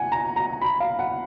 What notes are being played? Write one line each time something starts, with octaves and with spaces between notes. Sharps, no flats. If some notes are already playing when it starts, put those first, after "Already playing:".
Already playing: F#5 G#5
A#5
A#5
B5
F5
F#5